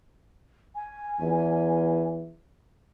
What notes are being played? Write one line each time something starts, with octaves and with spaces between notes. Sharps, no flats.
G#5
E2